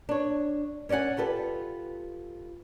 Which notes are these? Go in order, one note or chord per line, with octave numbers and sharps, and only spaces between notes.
D4 C#5
C#4 D5 D#5 F#5 G#5
F4 G4 A4 B4